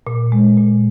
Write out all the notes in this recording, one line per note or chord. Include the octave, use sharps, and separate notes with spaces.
A#2
G#3
A#2